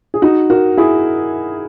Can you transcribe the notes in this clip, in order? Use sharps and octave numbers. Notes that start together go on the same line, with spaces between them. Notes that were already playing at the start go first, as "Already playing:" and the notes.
G#4
D#4 F#4
F#4 A#4
E4 G#4